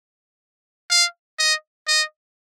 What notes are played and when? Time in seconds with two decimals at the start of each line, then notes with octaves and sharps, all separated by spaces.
0.90 F5
1.39 D#5
1.88 D#5